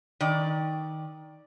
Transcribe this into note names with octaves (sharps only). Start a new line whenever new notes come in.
D#3 D5